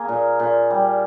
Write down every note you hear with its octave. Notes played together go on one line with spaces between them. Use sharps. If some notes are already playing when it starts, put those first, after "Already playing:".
Already playing: A#3 G#4
A#2
A#2
G3